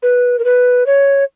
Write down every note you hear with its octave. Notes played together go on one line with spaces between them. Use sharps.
B4
A#4
B4
C#5